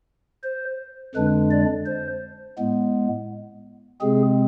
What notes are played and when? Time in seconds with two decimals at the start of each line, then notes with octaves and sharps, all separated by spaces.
0.44 C5
1.15 F2 D3 G#3 D4 B4
1.51 D5
1.86 C5
2.58 A2 G#3 B3
4.01 C3 G#3 C4 G#4